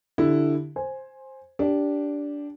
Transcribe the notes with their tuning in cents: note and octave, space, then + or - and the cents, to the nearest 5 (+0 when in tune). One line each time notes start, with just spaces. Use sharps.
D3 +0 E4 +0 G4 +0
C5 +10 G#5 +0
D4 -15 G4 +0